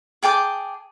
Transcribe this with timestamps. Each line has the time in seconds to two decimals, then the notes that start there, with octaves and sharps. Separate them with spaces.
0.23 G#4 G5 A5 D6